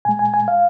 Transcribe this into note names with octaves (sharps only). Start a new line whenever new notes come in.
A#2 G#3 G#5
G#5
G#5
F5